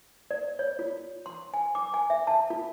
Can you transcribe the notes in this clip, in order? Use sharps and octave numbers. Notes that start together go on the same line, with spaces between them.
D5
C#5
F4
C6
G#5
D6
G#5
E5
A5
F4